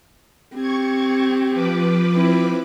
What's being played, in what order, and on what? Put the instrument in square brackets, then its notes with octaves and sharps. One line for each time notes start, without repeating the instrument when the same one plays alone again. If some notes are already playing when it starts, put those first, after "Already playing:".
[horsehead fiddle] C4 G4 [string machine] C#6 G#6
[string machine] F3 B4 D6
[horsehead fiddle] C4 E4